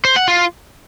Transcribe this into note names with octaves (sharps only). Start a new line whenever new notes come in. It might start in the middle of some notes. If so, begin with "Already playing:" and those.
C5
F#5
F4